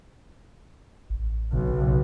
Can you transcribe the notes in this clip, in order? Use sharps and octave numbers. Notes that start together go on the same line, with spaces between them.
A1
B1 C#3